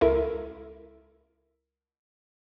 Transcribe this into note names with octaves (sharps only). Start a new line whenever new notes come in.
C#2 E4 A4 A#4 E5